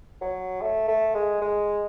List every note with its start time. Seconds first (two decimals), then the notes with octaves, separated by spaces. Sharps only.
0.21 F#3
0.61 A3
0.88 A3
1.14 G#3
1.41 G#3